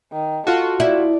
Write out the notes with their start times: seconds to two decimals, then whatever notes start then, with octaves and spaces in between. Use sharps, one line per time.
0.12 D#3
0.47 F4 F#4 A4
0.80 E4 D5